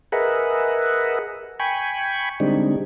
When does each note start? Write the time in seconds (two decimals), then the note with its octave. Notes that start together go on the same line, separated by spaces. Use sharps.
0.12 G#4 A#4 B4 D#5 E5 F#5
1.60 G5 G#5 B5 C#6
2.40 D3 G3 G#3 C4 D4 D#4